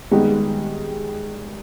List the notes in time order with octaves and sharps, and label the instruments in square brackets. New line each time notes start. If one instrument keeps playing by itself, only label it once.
[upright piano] D#3 G3 B3 D#4 G4 [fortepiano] G#3